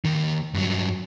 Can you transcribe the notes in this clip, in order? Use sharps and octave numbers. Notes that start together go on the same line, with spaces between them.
D#2 D#3
G2 F#3